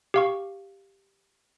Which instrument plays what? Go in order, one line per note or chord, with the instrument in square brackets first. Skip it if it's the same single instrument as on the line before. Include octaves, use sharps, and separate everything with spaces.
[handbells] G4 F5 C#6